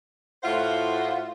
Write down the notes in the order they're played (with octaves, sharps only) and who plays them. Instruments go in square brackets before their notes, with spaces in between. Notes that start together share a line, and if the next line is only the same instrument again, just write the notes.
[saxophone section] A2 F4 F#4 C5 E5 F#5